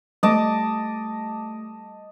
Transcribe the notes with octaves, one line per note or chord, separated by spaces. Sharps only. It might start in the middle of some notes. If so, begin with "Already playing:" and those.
G3 A3 D#5 A5 D6